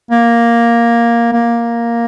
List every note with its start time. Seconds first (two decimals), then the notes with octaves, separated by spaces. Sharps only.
0.11 A#3
1.32 A#3